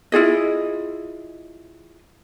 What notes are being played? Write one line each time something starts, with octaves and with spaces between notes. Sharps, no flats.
E4 F4 G#4 D#5